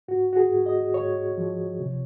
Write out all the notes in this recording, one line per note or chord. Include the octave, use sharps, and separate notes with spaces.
G#2 F#4
F#4
G#4
G#2
D#5
G#2 C#5
F3
C3